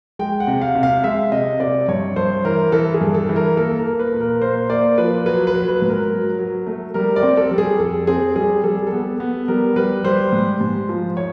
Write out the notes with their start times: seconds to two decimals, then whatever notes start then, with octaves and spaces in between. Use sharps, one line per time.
0.19 G#3 G5
0.40 F#5
0.47 C3
0.61 F5
0.75 C3
0.83 F5
1.04 G#3 E5
1.32 C3 D#5
1.60 C3 D5
1.88 G2 C#5
2.16 G2 C5
2.45 E3 A#4
2.72 E3 A4
2.94 G#4
3.01 G2
3.14 A4
3.29 E3
3.36 A#4
3.57 A#3 A4
3.78 A#4
3.85 A#3
3.99 B4
4.13 A#2
4.20 A#4
4.41 A#3 C5
4.70 A#3 D5
4.98 F3 B4
5.26 F#3 B4
5.47 B4
5.54 F#3
5.68 B4
5.82 G#2
5.89 A#4
6.11 F#3
6.39 F#3
6.67 A3
6.94 G3 A#4
7.16 D5
7.23 C4
7.37 A4
7.51 G3
7.58 G#4
7.79 F2 A4
8.07 C4 G#4
8.36 G3 G#4
8.64 G3 A4
8.75 G#4
8.87 A4
8.92 B3
9.20 B3
9.48 G3 A#4
9.76 G3 B4
10.04 G3 C5
10.32 G#2
10.61 G#2
10.89 F3
11.17 C#5